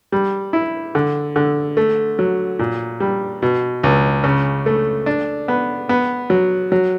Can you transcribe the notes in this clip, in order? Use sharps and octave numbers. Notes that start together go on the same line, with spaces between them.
G3
E4
D3
D3
A3
F#3
A#2
G3
B2
C#2
C#3
A3
D4
B3
B3
F#3
F#3